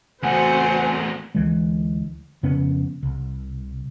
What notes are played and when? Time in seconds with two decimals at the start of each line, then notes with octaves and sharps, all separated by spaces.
0.23 E2 A3 C4 F#4 C5 F#5 G#5
1.35 D2 E3 G#3
2.43 F2 C#3 B3 C#4
3.03 C2